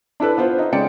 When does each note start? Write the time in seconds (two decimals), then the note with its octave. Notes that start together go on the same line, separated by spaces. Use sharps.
0.20 D4 E4 A4 B4
0.38 B3 F4 C5
0.59 D#4
0.72 C#3 G#3 D5 G5 C#7